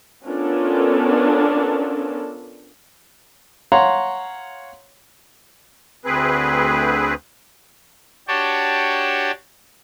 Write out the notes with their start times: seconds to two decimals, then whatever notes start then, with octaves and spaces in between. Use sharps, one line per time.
0.26 B3 C#4 D4 F4 A4 A#4
3.72 C#5 F5 F#5 A#5 C6
6.05 D2 C4 G#4 B4
8.28 D4 F#4 G4 C#5 G5 A5